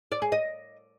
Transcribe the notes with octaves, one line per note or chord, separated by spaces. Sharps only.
D5
G#4
D#5